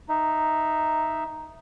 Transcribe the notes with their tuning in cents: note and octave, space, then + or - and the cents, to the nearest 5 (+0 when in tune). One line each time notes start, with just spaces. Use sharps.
D#4 +0 E5 +0